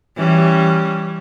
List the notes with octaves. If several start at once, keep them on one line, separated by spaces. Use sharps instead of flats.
E3 G3 C#4